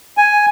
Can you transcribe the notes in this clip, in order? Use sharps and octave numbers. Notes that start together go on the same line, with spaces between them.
G#5